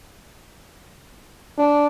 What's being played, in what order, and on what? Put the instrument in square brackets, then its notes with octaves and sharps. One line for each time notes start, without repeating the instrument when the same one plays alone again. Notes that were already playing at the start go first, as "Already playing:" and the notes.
[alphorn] D4